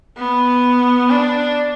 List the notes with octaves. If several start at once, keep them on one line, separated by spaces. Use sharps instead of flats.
B3
D4